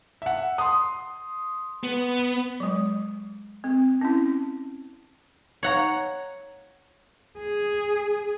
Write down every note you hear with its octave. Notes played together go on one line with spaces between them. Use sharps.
E5 F#5
C6 D#6
B3
F#3 G#3
C4
C#4 E4
C#5 F#5 A#5
G#4